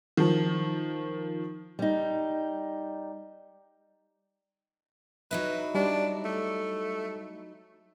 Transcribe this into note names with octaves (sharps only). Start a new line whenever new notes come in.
D#3 F3
G3 D#4
F#3 D#4 E4 B4
G3 D4
A3